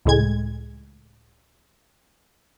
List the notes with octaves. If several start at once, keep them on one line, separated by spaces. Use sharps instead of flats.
C#2 A2 G#3 G#6